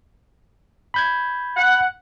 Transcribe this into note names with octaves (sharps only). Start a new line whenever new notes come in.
B5 G6 G#6
F#5